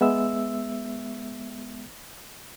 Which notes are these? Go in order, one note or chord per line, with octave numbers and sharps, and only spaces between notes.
G#3 B3 E5 E6